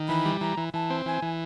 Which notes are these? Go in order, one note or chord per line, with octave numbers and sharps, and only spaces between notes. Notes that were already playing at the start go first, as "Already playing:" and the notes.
Already playing: D#3
E3 B5
G3
E3 A#5
E3
E3 A5
C4
E3 G#5
E3